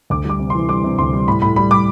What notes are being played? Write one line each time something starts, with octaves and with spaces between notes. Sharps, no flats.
D2 D6
G3 D6
C3
E3 C6
G3 D6
C3
D2 C6
G3
A2 B5
A2 B5
G3 B5
G3 D6